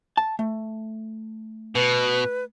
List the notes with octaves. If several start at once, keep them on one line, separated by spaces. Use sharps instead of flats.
A5
A3
B2 B4